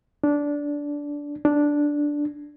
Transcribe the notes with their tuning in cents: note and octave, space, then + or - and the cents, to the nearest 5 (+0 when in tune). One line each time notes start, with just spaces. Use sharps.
D4 -15
D4 -5